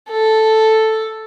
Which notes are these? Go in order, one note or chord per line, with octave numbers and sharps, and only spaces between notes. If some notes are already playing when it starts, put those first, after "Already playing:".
A4